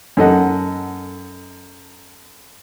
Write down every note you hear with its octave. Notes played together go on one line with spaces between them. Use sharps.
F#2 A4 D#5 F#5